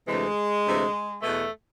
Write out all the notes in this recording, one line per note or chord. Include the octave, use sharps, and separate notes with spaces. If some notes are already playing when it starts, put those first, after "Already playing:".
D2 C3 E3 G#3
D2 C3 E3
E2 B2 A3